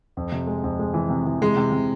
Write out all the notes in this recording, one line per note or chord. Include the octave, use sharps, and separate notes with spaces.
F2
C3
G#3
F2
G#3
E3
C3
E3
C3 G#3
C3
C3